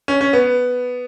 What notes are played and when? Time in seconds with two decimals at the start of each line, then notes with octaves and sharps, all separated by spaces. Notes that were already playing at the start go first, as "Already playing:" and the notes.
0.08 C#4
0.21 C#4
0.33 B3